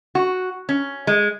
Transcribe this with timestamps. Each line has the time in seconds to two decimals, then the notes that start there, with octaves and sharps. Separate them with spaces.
0.15 F#4
0.69 C#4
1.07 G#3